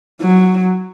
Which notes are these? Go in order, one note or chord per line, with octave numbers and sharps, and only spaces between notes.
F#3